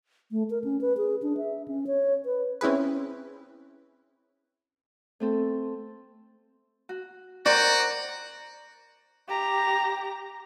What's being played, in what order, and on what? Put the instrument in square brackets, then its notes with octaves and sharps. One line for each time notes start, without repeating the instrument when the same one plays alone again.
[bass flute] A3
A#4
C#4
B4
G#4
D4
E5
C#4
C#5
B4
[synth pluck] C4 C#4 E4 G#4 B4
[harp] A3 C4 A4
F#4
[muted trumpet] F#4 [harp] A#4 C5 G5 [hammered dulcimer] D5
[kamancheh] G4 A#5